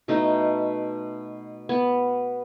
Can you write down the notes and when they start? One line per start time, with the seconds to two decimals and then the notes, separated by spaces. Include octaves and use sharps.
0.08 B2 A3 D#4
1.69 B3